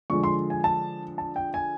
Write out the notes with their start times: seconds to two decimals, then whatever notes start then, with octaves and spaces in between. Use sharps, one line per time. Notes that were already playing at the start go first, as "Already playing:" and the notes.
0.10 D3 F3 G#3 C#6
0.24 C6
0.50 G#5
0.64 A5
1.18 A5
1.36 G5
1.54 G#5